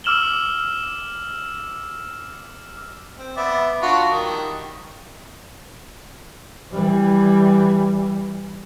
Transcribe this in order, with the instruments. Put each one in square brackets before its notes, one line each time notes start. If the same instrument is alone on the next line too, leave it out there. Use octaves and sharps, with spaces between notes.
[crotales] D6 E6 F6 E7 F#7 G7
[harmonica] C4
B3 D5 E5
D4 F4 F#4
D#3 G3
[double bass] E3 G3